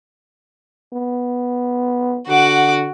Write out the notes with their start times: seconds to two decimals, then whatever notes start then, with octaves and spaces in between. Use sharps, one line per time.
0.93 B3
2.28 D3 F#4 F#5 D6